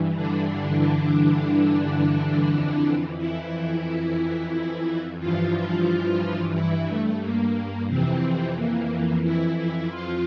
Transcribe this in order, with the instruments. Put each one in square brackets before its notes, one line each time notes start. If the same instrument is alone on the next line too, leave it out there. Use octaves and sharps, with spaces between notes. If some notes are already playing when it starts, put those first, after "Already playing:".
Already playing: [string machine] G2 E3
D3 D4
D3 D4
F2 E3
E3 E4
G2 E3 F3 F4
E3 E4
A3
A#3
F2 C3 E3 C4
A#3
E3 E4
E3 E4
F3 F4